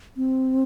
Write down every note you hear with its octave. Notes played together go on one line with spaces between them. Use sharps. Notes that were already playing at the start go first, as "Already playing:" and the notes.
C4